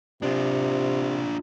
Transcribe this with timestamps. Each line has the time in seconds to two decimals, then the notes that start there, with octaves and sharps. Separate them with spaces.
0.23 C3 D4 F4